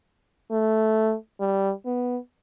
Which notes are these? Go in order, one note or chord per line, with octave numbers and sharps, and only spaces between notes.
A3
G3
B3